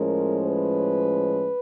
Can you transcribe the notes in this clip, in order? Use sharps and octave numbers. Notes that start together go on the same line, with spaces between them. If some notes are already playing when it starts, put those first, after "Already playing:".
Already playing: A2 F3 G#3 C#4 A#4
B4